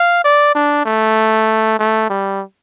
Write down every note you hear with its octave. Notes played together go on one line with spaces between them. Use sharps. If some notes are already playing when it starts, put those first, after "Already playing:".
Already playing: F5
D5
D4
A3
A3
G3